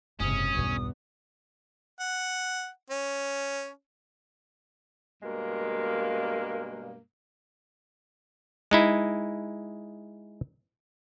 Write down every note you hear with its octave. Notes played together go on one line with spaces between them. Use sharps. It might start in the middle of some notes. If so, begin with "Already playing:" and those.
F#1 G#2 C3 C#4 D#6
B1 E2 G2 B3
F#5
C#4
G2 B2 G#3 A#3
G#3 D#4 E4